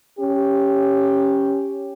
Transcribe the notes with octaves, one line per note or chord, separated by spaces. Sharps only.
C#4 G4